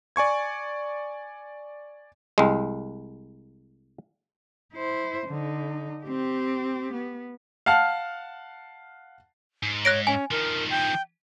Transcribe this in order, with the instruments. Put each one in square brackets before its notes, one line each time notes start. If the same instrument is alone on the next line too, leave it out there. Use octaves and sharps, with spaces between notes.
[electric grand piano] D5 G#5 C#6 G#6
[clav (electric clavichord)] C2 G#3
[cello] E4 C5
D3 D#4
C4 G4
B3
[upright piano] F5 F#5 A5 F6
[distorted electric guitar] G#2
[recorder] C#5 [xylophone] F#6 A#6 D7
[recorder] C#4 [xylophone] G#5
[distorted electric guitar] D#3 F3 [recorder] A#4
[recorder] G5